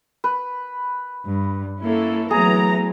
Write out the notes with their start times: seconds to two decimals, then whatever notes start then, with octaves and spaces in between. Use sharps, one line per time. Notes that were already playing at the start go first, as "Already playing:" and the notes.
0.24 B4
1.26 G2
1.84 A#3 C#4 E4 A4
2.31 E3 F#3 A3 B3 G#4 A#5